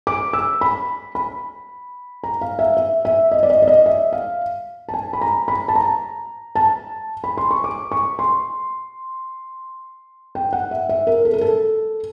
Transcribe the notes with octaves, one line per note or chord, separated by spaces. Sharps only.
D6
E6
B5
B5
A#5
F5
E5
E5
E5
D#5
D5
D#5
D5
D#5
E5
F5
A5
G#5
B5
A#5
B5
A5
A#5
A5
B5
C6
C#6
D6
C#6
C6
G5
F#5
E5
E5
A#4
A4
A#4
A4